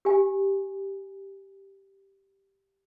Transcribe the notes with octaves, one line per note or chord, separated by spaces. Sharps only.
G4 G#5